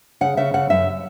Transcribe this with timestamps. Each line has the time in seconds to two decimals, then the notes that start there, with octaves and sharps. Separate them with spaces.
0.21 C#3 F#5
0.37 C#3 E5
0.54 C#3 F#5
0.70 F#2 E5